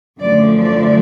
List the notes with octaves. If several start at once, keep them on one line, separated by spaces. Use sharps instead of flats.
F#2 D3 F3 A3 D5
D5